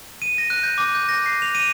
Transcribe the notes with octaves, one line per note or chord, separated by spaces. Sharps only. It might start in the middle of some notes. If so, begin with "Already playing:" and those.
D#7
A#6
F#6
G6
D6
G6
A#6
C7
F7
D#7